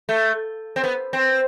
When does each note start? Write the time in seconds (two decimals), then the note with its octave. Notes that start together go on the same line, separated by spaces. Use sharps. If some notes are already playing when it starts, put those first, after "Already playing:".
0.09 A3
0.76 C4
0.84 B3
1.13 C4